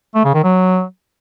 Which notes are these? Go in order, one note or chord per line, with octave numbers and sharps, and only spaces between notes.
A3
C#3
D#3
F#3